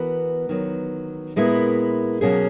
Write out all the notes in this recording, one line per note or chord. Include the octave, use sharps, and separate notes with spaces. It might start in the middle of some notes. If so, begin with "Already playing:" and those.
Already playing: E3 B3 F#4 A#4
D#3 F#3 B3
A#2 G#3 B3 E4 A#4
B2 F#3 A#3 C#4 G#4